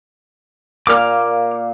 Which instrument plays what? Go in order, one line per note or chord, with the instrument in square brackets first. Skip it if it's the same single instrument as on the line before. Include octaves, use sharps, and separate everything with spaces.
[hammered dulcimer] A#2 A#3 F5 [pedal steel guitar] D6 F6